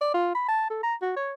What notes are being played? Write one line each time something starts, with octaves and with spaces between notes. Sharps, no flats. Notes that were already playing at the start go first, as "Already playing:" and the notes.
D5
F4
B5
A5
A4
A#5
F#4
C#5